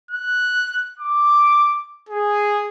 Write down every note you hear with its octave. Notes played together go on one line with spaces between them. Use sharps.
F#6
D6
G#4